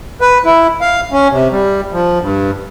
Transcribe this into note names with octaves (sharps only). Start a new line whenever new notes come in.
B4
E4
F5
C#4
C3
G3
F3
G2